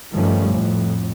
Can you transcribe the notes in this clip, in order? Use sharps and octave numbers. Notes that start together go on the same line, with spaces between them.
G2 D#3 F3 G3 A3 C#4
F2 A2